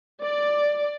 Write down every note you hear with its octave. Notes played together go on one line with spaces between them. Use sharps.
D5